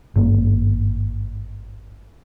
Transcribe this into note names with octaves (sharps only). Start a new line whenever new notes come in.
G#1 G2 A#3